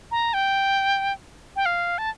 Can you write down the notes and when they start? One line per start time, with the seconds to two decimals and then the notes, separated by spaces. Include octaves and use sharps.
0.11 A#5
0.34 G5
1.56 G5
1.66 F5
1.98 A5